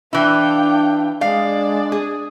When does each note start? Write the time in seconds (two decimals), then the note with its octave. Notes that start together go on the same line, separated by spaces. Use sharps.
0.13 E3 D4 E4 F5 G5
1.21 G#3 D4 D5 F5
1.92 G#4